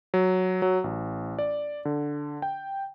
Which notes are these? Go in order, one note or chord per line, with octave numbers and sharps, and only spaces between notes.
F#3
F#3
A1
D5
D3
G5